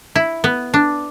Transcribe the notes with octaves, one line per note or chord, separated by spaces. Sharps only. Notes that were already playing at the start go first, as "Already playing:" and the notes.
E4
B3
D4